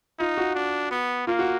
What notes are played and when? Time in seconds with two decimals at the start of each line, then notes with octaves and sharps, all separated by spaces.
0.19 D#4 F4
0.37 F#4
0.55 D4
0.91 B3
1.27 A#3 F4
1.39 F#4